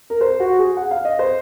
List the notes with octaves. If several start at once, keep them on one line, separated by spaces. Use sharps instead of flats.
A#4
C5
F#4
G#4
F#5
F5
D#5
C5